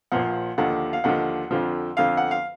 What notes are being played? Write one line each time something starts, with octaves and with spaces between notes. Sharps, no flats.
A#1 A#2 F3 F#5
D#2 D3 F3 F#5
F5
D#2 D3 F3 F#5
F2 D3 F3
F2 D3 F3 F5
F#5
F5